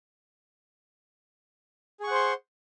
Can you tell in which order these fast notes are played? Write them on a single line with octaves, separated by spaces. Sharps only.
G#4 C#6 F#5 C5 C6